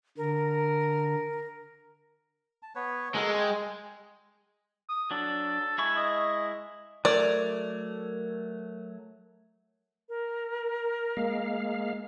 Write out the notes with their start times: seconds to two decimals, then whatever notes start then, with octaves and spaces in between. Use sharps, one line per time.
0.17 D3 A#4
2.63 A5
2.75 B3 B4 C#5
3.15 G#3 F#4 A4 A#4
3.37 G5 G#5
4.89 D#6
5.11 F#3 D4 A4
5.78 G#3 E4 G#5 C#6
5.96 D#5
7.05 F#3 A3 A#4 C#5 D5
10.09 A#4
11.17 G#3 A#3 F5